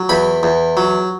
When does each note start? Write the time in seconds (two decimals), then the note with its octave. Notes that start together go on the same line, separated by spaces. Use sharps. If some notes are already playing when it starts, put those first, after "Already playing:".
Already playing: F#3
0.09 E2 B5
0.43 E2
0.77 F#3